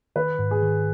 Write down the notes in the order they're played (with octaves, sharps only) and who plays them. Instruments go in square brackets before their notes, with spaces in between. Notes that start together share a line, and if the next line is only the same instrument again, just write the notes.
[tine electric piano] D#3 [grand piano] B4
[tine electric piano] G#2
[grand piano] G#4
[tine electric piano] D#3